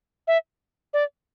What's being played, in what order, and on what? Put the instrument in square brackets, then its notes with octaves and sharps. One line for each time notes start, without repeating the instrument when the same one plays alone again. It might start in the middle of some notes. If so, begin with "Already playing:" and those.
[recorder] E5
D5